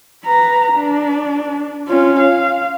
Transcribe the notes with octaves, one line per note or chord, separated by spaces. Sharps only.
B4 A#5
D4
C#4 F4
F5